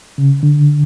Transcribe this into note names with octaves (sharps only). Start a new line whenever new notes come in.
C#3
D3